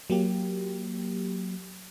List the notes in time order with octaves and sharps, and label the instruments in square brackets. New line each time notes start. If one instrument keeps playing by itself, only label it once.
[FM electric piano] F#3 A#3 G4